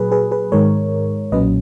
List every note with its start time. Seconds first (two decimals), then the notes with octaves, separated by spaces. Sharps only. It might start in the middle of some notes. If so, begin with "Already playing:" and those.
Already playing: A#2 F#3 G#4 B4
0.11 G#4 B4
0.31 G#4 B4
0.52 G#2 D#3 G#3 A#4 C#5
1.32 B1 A#2 F#3 C#4 B4 D#5